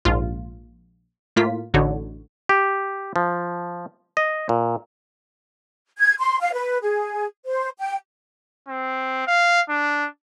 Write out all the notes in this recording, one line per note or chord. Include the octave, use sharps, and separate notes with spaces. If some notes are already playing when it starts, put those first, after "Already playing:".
A#1 G#2 F4
A2 A#3 F4 B6
A1 D3 D#4 F#4 C#5
G4
F3
D#5
A#2
G#6
C6
F5
B4
G#4
C5
G5
C4
F5
D4